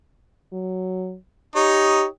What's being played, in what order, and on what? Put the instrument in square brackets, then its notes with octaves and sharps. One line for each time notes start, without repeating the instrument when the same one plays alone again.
[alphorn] F#3
[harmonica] D#4 C#5 D#6 [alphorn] G4